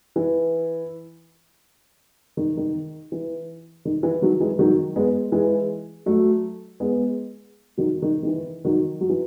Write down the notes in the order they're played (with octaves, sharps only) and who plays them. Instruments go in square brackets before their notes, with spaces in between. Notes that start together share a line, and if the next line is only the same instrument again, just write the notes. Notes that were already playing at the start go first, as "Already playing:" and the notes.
[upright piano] E3
D#3
D#3
E3
D#3
E3
D#3 F#3
E3 G#3
D#3 F#3
G#3 B3
E3 G#3
F#3 A3
G#3 B3
D#3 F#3
D#3
D#3
E3
D#3 F#3
F#3
E3